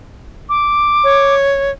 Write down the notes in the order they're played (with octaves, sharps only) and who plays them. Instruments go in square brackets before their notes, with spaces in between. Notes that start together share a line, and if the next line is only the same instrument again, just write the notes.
[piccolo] D6
[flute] C#5